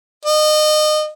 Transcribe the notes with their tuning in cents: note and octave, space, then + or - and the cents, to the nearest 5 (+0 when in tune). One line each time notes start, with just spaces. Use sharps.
D#5 -30